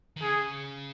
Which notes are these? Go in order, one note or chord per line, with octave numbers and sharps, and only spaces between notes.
D#3
C#3 G#4